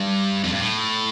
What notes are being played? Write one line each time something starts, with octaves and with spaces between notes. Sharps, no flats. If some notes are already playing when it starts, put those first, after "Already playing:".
Already playing: G2
F2
G2
A2